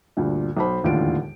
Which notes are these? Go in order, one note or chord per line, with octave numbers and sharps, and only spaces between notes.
D2 G2 A#2
B1 C5 B5
E1 D#2 A2 D3 F4 D7